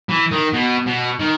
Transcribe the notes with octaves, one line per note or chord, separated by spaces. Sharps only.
E3
D#3
B2
B2
D#3